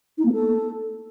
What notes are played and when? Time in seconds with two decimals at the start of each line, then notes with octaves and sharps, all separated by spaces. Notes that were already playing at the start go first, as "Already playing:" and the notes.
0.18 D#4
0.25 A#3
0.33 A4